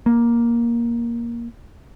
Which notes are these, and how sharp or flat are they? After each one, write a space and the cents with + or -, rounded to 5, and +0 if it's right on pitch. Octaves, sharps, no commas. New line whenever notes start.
A#3 +10